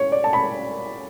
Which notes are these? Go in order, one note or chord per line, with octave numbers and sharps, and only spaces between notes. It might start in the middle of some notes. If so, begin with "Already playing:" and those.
Already playing: C#5
D5
A5
B5